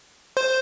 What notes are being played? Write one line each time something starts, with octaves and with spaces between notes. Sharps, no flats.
C5